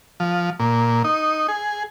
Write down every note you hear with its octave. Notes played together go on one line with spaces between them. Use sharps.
F3
A#2
D#4
G#4